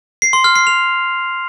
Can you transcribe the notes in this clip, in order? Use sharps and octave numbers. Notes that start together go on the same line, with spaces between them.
C7
C6
F6
C7
F7